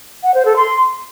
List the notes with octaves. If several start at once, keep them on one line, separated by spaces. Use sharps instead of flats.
F#5
C5
A4
C6